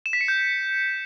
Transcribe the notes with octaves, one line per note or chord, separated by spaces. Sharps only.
E7
B6
C#7
G6